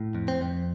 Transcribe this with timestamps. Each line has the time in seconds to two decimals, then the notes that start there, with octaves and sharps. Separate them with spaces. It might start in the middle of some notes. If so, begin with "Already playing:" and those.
Already playing: A2
0.15 F2
0.28 C4
0.41 F2